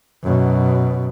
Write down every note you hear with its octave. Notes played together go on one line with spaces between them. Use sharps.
F#2 B2